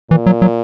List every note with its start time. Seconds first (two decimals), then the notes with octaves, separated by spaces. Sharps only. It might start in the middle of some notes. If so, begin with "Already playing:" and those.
0.10 A#2 E3
0.26 F#3
0.42 F#3